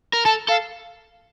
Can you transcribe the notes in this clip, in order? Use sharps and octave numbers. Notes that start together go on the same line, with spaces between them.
A#4
A4 A5
A4 F5